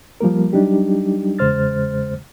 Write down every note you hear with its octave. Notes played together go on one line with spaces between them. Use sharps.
F3 G3 A#3 A#4
F#3 G3 D4 D#4 G4
E2 C#3 G#3 C5 F6 A6